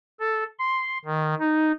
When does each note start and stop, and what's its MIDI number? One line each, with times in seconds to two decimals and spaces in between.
0.20 0.44 69
0.59 0.98 84
1.05 1.34 51
1.39 1.72 63